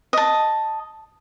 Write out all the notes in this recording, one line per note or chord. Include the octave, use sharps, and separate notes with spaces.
D#5 A5